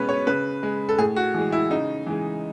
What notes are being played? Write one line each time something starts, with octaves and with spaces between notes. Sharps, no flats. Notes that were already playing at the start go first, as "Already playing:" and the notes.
Already playing: B2 G#3 B3 C#4 B4
C#5
C#3 B4
G#3
A4
A2 G#4
F#4
E3 G#3
E4
C#3 D#4
E3 G#3